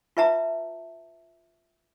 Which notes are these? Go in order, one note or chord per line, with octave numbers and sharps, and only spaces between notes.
F4 B4 E5 A5 A#5